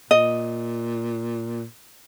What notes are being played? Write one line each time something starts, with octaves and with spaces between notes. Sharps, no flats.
A#2 D#5